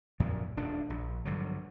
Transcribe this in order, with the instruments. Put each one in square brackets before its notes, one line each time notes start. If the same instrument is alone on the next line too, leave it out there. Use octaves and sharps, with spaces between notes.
[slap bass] F#2 A#2 F3
D#1 D2 D4
A#1
G2 D3 F3 F#3